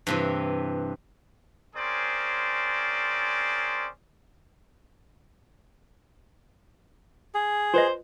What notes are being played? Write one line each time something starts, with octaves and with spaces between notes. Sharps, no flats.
G2 C3 E3
C4 C#4 G#4 A#4 C5 D5
G#4
F4 B4 C5 D#5